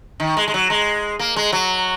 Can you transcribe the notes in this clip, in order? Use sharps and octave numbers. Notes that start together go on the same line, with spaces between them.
D#3
G#3
G#3
F#3
G#3
A#3
G#3
F#3